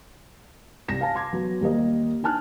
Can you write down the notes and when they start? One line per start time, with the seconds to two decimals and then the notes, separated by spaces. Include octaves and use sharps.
0.88 C2 A#6 E7
1.01 F5 G#5 A5
1.16 C6 D6 G#6
1.32 F#3 B3
1.61 D#2 G3 A#3 G4 A#4 D#5
2.23 D4 D#4 G#5 A5 F6 F#6